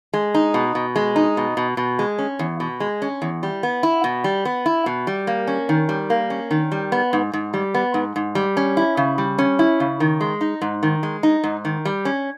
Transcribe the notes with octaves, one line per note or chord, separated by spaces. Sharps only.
G#3
D#4
B2
B2
G#3
D#4
B2
B2
B2
G#3
C#4
E2
B2
G#3
C#4
E2
G3
B3
E4
B2
G3
B3
E4
B2
G3
A#3
C#4
D#3
G3
A#3
C#4
D#3
G3
B3
G#2
G#2
G3
B3
G#2
G#2
G3
C#4
E4
C#3
G3
C#4
E4
C#3
D#3
G#3
D#4
G#2
D#3
G#3
D#4
G#2
D#3
G3
C#4